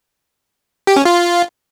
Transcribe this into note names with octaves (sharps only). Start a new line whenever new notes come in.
G4
C#4
F4